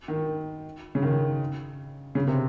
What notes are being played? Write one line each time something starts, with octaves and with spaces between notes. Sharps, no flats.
D#3
C#3
D#3
C#3
C3